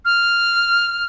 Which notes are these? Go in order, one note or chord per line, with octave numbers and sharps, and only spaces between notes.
F6